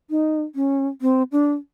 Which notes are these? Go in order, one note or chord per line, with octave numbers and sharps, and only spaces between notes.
D#4
C#4
C4
D4